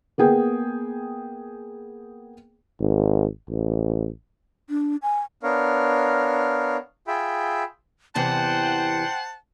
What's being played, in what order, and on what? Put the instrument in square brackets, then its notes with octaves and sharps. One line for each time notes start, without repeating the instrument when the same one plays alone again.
[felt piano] A#3 B3 G#4 G5
[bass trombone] G#1
A1
[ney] D4
G#5
[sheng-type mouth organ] B3 D4 A#4 C#5 F5
F4 G#4 E5 G5 B5
[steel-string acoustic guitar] E2 C3 E3 [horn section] C5 F#5 [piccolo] G5 [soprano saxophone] A5